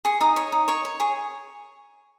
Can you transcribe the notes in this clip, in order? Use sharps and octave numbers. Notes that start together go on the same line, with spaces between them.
G#4 C#6
D#4 D#6
C#5 C#6
D#4
C#5 C#6
C#5
G#4 C#6